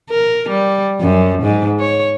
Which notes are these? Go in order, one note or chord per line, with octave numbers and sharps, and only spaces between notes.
A#4
G3
F#2
G#2
C#5